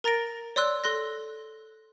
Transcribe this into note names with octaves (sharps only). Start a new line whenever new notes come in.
A#4 A#5 A6 A#6 D7
C#5 D5 C6 E6 F#6
A4 C6 F#6 A#6